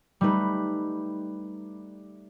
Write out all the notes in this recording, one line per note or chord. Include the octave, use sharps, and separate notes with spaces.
G3 A3 D#4 B4